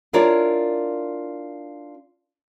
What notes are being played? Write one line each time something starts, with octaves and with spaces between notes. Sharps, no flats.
D4 E4 F4 A#4 C#5 D5